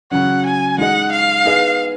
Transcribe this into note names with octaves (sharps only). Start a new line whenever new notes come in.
C#3 F#3 C#4 F#5
G#5
G#3 D#4 G#4 D#5 F#5
F5
B3 D#4 G#4 B4 D#5